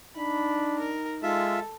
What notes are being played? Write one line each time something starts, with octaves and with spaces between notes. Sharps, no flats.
D4 D#4 B5
A#4
G#3 F4 A4 E5